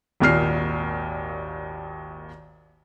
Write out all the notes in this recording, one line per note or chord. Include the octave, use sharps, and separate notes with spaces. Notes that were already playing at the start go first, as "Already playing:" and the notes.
G#1 D#2 A#2 F6 C7